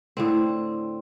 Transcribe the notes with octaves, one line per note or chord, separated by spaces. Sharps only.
A2 D3 C4